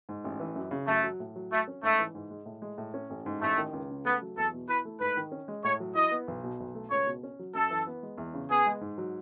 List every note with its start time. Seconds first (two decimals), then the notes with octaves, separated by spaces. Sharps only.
0.09 G#2
0.24 A1
0.40 E3
0.56 F#2
0.71 C#3
0.87 F#2 A3
1.03 F#3
1.20 A2
1.36 F#3
1.51 A3 F#4
1.68 C#4
1.83 G#2 A3
1.99 E3
2.15 G#2
2.31 G#3
2.46 A2
2.62 G#3
2.78 A2
2.94 C#4
3.10 A1
3.26 G#2
3.41 A1 A3
3.58 D#3
3.73 C#2
3.90 C#3
4.05 A3 B3
4.22 F#3
4.37 E2 A4
4.53 B2
4.68 E4 B4
4.85 A3
5.00 G#2 B4
5.17 D#3
5.32 C#4
5.48 G#3
5.64 A2 C#5
5.80 F#3
5.95 E4 D#5
6.11 B3
6.28 B1
6.44 B2
6.60 B1
6.75 A3
6.91 C#2 C#5
7.06 B2
7.23 C#4
7.39 F#3
7.54 F#2 A4
7.70 E3
7.87 B3
8.03 G#3
8.18 E2
8.34 C#3
8.51 B3 G#4
8.66 G#3
8.81 G#2
8.98 F#3